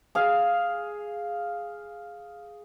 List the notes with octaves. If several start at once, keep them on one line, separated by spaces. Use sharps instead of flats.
G#4 F5